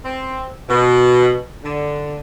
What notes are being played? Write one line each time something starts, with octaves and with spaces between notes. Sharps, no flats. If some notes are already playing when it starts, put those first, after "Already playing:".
C4
B2
D3